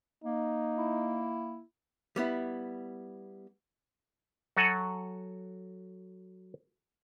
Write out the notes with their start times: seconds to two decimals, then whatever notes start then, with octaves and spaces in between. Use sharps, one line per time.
0.24 A#3 D#4
0.78 E4
2.16 G3 B3 E4
4.57 F#3 F#4 A4 F#5 G#5